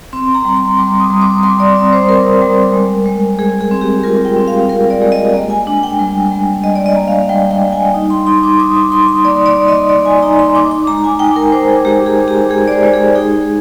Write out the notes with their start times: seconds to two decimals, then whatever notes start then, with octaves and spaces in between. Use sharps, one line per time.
0.13 C4 C6
0.35 A#5
0.45 G3
0.56 C6
0.78 G3 D6
1.00 D#6
1.10 G3
1.22 D6
1.43 G3 C6
1.60 D5
1.76 C4 D5
1.93 C5
2.09 G3 A#4
2.41 G3
2.73 G#3
3.06 G#3
3.39 G#3 G#4
3.61 G#4
3.71 C4
3.81 G4
4.03 F4 A#4
4.25 G5
4.36 C4
4.48 F5
4.69 C4 A#4
4.90 D5
5.01 G#3
5.12 D#5
5.34 A#3
5.50 G#5
5.67 D4
5.83 G5
5.99 G3
6.31 G3
6.64 G3 D#5
6.75 D5
6.86 D#5
6.96 A#3
7.08 F5
7.29 G3 G5
7.51 G5
7.62 G3
7.72 G#5
7.94 D#4
8.10 C6
8.26 D#4 C6
8.43 D6
8.59 D#4 D#6
8.76 D6
8.92 D#4 C6
9.08 C6
9.24 A#3 D5
9.46 D5
9.57 A#3
9.68 D#5
9.89 D#4 D5
10.05 G#5
10.22 D#4 A#5
10.39 C6
10.55 D#4 D6
10.71 D6
10.87 G#3 A#5
11.04 G#5
11.19 D#4 G5
11.36 A#4
11.52 D#4 C5
11.69 G#4
11.85 G#3 G4
12.06 G#4
12.18 G#3
12.28 G4
12.50 G#3 G#4
12.68 D5
12.72 C5
12.83 G#3
12.94 G#4
13.15 D#4 G#4